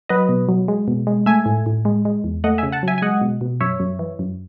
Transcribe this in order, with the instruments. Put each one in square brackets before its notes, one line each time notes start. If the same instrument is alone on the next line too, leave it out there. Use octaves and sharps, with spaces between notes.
[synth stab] F#3 B4 D#5
B2
F#3
G#3
B2
G#3
A3 E5 G#5
A2
A2
G#3
G#3
E2
A3 D#5 F#5
E5 G#5
C#3
F#5 A5
F#3 E5 G#5
G#5
G#3 D#5 F#5
B2
B2
F#2 C#5 E5
F#2
E3
F#2